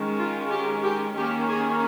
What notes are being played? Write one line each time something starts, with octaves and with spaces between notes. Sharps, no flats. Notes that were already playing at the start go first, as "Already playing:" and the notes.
Already playing: D#3 G#3 C#4
F4
G4
G4
D#3 A#3 C#4 G4
G#4